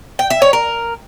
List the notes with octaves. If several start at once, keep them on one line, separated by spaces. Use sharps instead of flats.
G5
E5
C#5
A#4